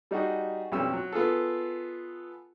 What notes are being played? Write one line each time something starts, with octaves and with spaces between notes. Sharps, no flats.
G3 D#4 F#4 G#4
B1 F2 G3 C#4 E6
F#3
B3 F4 G#4 A4